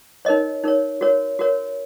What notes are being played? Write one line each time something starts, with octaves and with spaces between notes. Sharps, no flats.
D#4 A#4 C#5 D#5
D#4 A#4 C#5
F#4 A#4 C#5
F#4 A#4 C#5